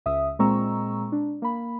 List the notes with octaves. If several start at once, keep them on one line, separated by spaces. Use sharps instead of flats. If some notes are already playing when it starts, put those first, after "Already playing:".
C#2 E5 D#6
A#2 G#3 C4 A#5 C#6 E6
D4
A#3 B5